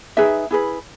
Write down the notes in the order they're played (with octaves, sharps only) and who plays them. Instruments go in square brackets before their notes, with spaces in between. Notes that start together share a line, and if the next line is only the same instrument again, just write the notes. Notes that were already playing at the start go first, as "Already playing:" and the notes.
[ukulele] D#4 G#4 B4 E5
E4 G#4 B4